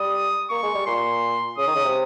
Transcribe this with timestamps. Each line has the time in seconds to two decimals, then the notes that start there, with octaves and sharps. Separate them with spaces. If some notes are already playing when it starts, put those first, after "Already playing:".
Already playing: G3 D#6
0.50 A#3 C#6
0.63 G#3
0.74 G3
0.87 A#2 C6
1.57 C#3 D#6
1.67 D#3
1.75 C#3
1.84 C3